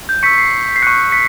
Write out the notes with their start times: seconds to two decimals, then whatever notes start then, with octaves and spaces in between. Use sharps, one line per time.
0.09 G6
0.23 C#6 E6 G6 B6 C#7
0.38 C7
0.76 C7
0.82 C#6 F#6 B6 C#7
1.12 B6 C#7